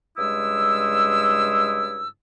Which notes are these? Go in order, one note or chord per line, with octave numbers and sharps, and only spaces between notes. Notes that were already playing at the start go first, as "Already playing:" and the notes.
G2 C#3 G#3 E4 D#6 E6